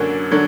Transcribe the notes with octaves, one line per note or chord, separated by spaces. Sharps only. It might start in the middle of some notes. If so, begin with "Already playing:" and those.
Already playing: F#2 D3 F#3 A#3
D3 F#3